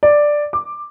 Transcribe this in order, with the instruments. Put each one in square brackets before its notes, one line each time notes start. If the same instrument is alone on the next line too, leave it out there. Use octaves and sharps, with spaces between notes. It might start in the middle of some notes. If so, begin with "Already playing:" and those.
[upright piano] D5
D6